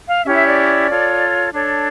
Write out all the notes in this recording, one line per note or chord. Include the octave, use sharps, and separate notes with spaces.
F5
C#4 E4 G4 C#5 E5
E5
D5
F4 A4 C#5
D4 A4 C#5